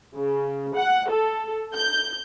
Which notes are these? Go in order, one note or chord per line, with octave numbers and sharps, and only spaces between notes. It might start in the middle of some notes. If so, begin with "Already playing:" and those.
C#3
F#5
A4
G6